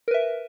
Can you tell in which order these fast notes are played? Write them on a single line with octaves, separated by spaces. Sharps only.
A#4 B4 E5